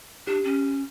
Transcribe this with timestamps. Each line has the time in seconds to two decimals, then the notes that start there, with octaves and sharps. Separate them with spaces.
0.27 D4 G4
0.44 C#4